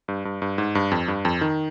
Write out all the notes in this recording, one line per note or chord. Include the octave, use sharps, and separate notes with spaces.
G2
G2
G2
G#2
G2
F2
G2
F2
D#3